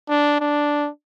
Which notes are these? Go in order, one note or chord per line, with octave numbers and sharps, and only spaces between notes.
D4
D4